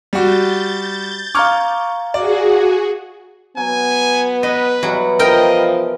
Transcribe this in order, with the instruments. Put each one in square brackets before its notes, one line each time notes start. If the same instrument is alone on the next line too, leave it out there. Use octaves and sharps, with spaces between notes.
[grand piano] G3 F#4 [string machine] G6 A6
[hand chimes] F5 A#5 G#6 [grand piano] C#6 D6 F6
[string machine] F#4 G#4 [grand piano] D5
[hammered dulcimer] F#3 [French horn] B3 [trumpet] G#5
[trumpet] B4 [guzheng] D#5
[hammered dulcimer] B2 E3 G3 [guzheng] F#3
[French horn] F3 [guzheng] A#4 G5 [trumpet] D#5